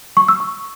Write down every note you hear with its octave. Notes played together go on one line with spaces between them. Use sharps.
C#6
E6
C#6